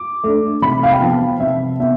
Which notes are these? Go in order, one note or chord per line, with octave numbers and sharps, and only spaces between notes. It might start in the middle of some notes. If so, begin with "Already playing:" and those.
Already playing: D6
A3 D4
C3 B5
F5
G5
F3 B3 A5
C3 E5
B3 E5